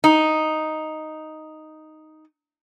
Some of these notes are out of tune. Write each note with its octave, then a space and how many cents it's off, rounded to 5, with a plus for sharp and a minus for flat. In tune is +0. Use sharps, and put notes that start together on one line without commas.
D#4 +0